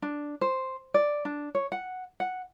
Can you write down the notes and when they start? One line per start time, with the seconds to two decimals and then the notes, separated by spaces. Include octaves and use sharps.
0.02 D4
0.41 C5
0.94 D5
1.25 D4
1.55 C#5
1.72 F#5
2.20 F#5